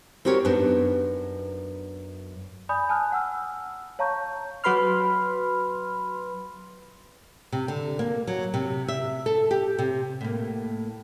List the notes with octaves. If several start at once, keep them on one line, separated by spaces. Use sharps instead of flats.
C4 F#4 G4 A#4 C#5
F#2 B3 D4 D#4
D5 G#5 B5 D#6 G6
G#5 A5 D#6 F6 F#6
F#5 E6 F6
C#5 F5 A5 A#5 C#6 G6
F#3 F#4 B4 B5 C6 F6
C3
D3
A#3
F#3
C3
E5
A4
G4
C3
A2 A#3